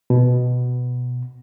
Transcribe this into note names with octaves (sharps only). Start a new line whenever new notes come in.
B2